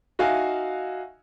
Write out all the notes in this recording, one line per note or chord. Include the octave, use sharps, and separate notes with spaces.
D#4 F#4 E5 F5 G#5